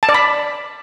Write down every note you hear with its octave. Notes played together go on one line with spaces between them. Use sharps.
A5
D5
B5